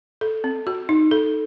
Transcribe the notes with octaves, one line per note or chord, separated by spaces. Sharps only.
A4
C4
F#4
D#4
A4